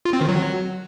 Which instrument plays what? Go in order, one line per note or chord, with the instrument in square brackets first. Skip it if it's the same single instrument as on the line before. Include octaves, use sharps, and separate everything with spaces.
[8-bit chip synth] F4
C4
D#3
F#3